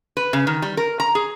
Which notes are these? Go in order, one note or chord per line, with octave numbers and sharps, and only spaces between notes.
B4
C#3
D#3
G3
A#4
A#5
G#4